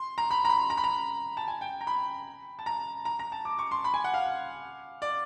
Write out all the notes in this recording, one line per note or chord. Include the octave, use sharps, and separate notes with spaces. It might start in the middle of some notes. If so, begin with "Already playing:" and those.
Already playing: C6
A#5
B5
A#5
B5
A#5
B5
A#5
A5
G#5
G5
A#5
B5
A5
A#5
A#5
A#5
A5
D6
C#6
C6
B5
G#5
F#5
F5
D5